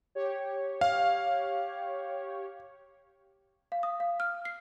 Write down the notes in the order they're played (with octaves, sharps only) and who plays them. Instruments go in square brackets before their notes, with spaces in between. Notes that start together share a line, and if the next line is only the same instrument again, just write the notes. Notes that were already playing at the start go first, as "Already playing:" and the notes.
[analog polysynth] G4 C#5
[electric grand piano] F5
[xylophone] F5
D#6
F5
F6
C7